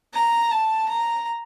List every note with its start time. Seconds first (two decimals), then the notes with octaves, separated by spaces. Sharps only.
0.14 A#5
0.51 A5
0.88 A#5